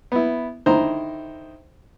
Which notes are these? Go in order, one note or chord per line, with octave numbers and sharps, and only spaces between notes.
B3 E4
D3 D#3 E4 C5 A#5